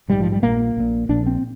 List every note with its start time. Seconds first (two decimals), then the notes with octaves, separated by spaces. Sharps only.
0.08 A#1 G#2 G3
0.20 F3
0.32 G3
0.42 A#1 A#2 A#3
0.77 A#1 A#2
1.09 A#1 A#2 D4
1.26 C4